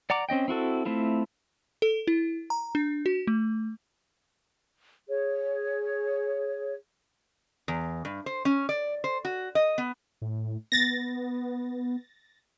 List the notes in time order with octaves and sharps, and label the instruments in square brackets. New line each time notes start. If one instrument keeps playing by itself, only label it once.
[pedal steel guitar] D5 F#5 A#5 D6
C4 C#4 D#5 G5
C4 E4 F#4 A4
A3 C4 E4 F4
[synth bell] A4
E4
A#5
D4
F#4
A3
[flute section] G#4 C#5
[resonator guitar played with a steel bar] E2
G2
C5
C#4
D5
C5
F#4
D#5
B3
[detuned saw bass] A2
[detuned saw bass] B3 [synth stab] A6 A#6